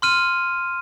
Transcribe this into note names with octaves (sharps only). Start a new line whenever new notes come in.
C6 F6 D#7